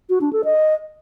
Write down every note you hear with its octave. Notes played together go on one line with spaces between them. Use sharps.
F#4
D4
A4
D#5